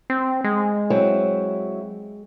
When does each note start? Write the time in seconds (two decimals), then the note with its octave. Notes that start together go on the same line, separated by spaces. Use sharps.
0.10 C4
0.44 G#3
0.90 F#3 C4 E4